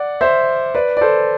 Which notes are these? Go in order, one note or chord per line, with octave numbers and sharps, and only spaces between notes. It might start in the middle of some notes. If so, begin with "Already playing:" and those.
Already playing: D5 F#5
C5 E5
B4 D5
D5
A4 C5